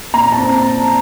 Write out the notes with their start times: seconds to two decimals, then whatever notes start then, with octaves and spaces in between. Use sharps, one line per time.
0.14 A#2 A#5
0.32 A5
0.38 C4